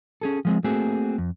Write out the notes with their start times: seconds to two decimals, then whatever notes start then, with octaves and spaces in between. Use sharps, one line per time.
0.21 C#4 G#4 A4
0.45 F3 G#3 C4
0.64 A3 A#3 C4 F#4 G#4
1.18 F2